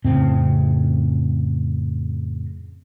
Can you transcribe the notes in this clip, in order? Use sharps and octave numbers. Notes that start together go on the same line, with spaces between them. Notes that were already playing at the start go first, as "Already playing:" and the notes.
F2 A2 C#3 C4